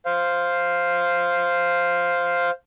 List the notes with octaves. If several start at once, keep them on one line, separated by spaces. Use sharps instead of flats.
C5 F5